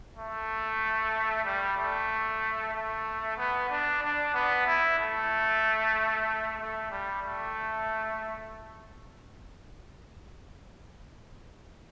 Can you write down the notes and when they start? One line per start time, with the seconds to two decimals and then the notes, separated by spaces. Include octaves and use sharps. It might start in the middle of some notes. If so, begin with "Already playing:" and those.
0.16 A3
1.44 G3
1.76 A3
2.73 A3
3.37 B3
3.69 D4
4.02 D4
4.34 B3
4.66 E4
4.98 A3
6.59 A3
6.90 G3
7.23 A3